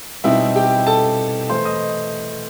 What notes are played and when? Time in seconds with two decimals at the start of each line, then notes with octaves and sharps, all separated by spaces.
0.24 B2 G3 C4 D#4 E4 E5
0.56 G4 G5
0.87 A4 A5
1.49 E3 A3 E4 C5 C6
1.65 D#5 D#6